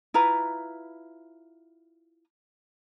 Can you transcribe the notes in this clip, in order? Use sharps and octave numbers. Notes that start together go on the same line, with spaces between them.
E4 F4 B4 A#5